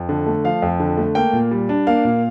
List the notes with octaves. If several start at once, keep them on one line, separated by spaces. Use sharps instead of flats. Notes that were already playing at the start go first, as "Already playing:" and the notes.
Already playing: F2
D3
A3
F3 F5
F2
D3
A3
A#3 G5
A#2
G3
D4
A#3 F5
A#2